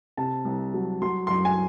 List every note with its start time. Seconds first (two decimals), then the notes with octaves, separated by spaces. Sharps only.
0.17 C3 A5
0.45 C2
0.74 F#3
1.02 F#3 C6
1.27 F#2 C6
1.45 G#5